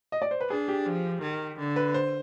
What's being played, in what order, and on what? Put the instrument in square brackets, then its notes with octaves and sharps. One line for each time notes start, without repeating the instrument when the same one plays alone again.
[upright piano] D#5
D5
C5
B4
[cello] D4 [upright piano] G#4
[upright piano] G4
[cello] F3
D#3
D3
[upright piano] B4
C5